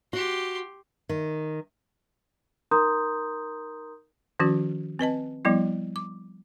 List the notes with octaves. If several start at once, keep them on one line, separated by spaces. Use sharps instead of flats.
F#4 G4 C6
D#3
D#4 A#4 A#5 C6 D#6 G6
D#3 F3 C#4 F#4
C4 B4 D#5 A5
F3 G3 B3 E4
D6